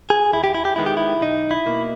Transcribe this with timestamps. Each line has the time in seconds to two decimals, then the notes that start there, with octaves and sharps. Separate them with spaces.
0.10 G#4
0.33 D#2 E4
0.44 G4
0.54 E4
0.65 G4
0.76 D#3 G#3 B3 E4
0.86 G4
0.97 E4
1.21 B1 D#4
1.51 E4
1.66 B2 A#3